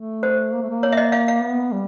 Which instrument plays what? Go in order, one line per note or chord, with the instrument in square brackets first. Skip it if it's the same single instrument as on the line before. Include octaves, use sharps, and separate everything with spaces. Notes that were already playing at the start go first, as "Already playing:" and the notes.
Already playing: [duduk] A3
[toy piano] C5
[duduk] A#3
A3
A#3
[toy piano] C#5
E5
D#5
F5
F5
[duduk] B3
G3